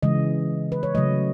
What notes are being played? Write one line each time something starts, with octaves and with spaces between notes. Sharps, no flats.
C#3 E3 G#3 D#5
B4
C#5
C#3 F#3 A3 D#5